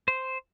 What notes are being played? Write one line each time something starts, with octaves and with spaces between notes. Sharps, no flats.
C5